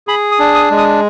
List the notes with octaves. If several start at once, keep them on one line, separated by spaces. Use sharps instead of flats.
G#4 B5
D#6
D4
D#6
G#3
D#6